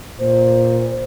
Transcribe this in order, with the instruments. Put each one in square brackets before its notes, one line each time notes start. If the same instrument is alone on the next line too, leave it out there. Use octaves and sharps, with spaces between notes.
[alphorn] A#2 [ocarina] C5